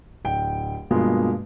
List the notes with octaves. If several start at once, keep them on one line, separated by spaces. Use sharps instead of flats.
D1 G5 D7
G2 B2 F3 G#3 A#3